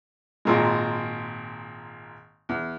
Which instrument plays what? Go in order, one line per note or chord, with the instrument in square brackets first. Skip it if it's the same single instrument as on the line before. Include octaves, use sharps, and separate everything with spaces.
[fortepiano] G#1 A#2 G#3
E2